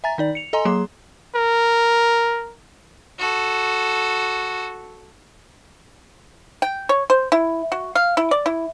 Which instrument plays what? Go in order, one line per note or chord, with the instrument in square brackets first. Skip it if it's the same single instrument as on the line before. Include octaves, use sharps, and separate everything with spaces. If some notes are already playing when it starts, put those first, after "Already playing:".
[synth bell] E5 G#5 A#5 A6
D#3 D#4 D5
C#7 F7
A4 D#5 G#5 A#5 C6
F#3 A#3 G#4 C6
[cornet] A#4
[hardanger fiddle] F#4 A4
[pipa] G5
C#5
C5
E4
F#4
F5
E4
D5
E4